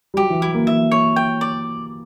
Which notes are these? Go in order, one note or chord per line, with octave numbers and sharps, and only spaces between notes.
G3
F#3 G4
E3
F#3 E4
A#3
E3 E5
C#5
G5
D5